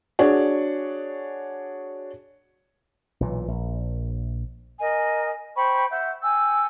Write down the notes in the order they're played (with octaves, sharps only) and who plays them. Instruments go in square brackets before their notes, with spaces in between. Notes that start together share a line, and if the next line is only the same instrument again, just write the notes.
[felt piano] D4 F#4 G#4 C#5 D5
[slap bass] B1 A#2 E3
A#1
[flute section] A#4 D#5 G#5
C5 G5 B5 C#6
E5 F#5 G6
G5 G#5 E6